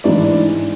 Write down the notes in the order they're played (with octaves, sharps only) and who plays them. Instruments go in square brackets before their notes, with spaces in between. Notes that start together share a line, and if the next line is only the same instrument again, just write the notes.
[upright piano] G#2 E3 D4 D5